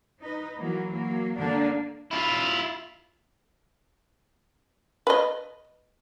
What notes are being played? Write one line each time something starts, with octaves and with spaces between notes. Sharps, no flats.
D#4 B4
E3 F#3 A#3
F#3 A#3
D3 A#3 D4
E4 F4
B4 D#5